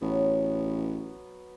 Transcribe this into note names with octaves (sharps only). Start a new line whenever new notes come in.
A1 F#3 B3